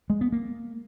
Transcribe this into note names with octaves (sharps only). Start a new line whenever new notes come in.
G#3
B3
A#3